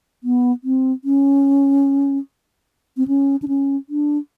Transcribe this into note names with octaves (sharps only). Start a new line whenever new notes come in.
B3
C4
C#4
C4
C#4
D4
C#4
D4